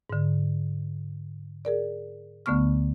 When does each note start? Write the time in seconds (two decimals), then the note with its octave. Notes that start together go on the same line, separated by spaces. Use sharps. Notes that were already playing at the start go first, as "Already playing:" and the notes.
0.10 G#2 D3
1.65 G#4 A#4 D5
2.46 D2 D3 A3 B3 C#6 F6